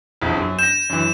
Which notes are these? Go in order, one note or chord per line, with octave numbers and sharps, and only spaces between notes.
E1 A#1 F2
F#2
G6 A#6 E7
F#2 E3